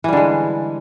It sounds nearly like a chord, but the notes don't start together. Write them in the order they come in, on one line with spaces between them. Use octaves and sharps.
E3 G3 D3 G#3